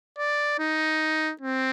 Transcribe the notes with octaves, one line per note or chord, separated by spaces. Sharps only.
D5
D#4
C4